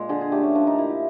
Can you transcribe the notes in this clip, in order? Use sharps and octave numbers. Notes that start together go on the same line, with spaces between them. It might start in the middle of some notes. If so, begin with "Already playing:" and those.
Already playing: A#2 G#3
D3 G#4
G#4
A3 G4
C#4
F3 D4
D#4
A#2 E4
E4